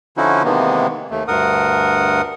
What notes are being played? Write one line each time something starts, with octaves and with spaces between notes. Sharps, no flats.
D3 F3 C#4 D#4 E4 F#4
C3 D#3 E3 G#3 A#3 B3
D#2 A3
D2 G2 A#4 F#5 D#6